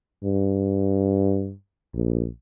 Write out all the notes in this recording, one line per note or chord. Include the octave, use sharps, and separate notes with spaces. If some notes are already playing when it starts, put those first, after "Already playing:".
G2
A#1